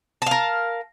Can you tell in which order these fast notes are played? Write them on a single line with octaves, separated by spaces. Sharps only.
A5 F5 A#4